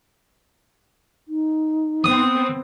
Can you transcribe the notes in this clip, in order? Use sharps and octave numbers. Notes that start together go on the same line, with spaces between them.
D#4
B3 C4 D#6